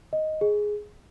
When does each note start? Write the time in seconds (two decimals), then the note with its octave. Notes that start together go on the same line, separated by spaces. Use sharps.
0.13 D#5
0.41 G#4